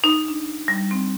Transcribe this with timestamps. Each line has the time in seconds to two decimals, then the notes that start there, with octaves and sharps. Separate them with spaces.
0.04 D#4
0.28 D4
0.68 G3
0.91 C4